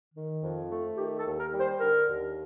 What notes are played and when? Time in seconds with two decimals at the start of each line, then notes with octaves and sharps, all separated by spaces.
0.14 D#3
0.42 F2
0.70 A3
0.97 D#3 G4
1.18 A4
1.25 D#2
1.39 A#4
1.52 G3
1.60 C5
1.80 D3 A#4
2.08 D#2